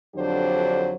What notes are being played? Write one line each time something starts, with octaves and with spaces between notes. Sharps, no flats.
F2 D3 F#3 D4 G4 C5